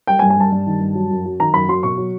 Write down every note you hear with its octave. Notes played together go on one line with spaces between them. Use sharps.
G3 G5
G#5
G2
G#5
G3 A5
G2
D#3
G2
F#3
F#2
F#3
D#3 A#5
F#2 B5
F#3 C6
B2 C#6
F#3